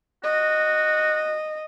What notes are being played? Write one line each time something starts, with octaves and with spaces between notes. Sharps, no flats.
F#4 D#5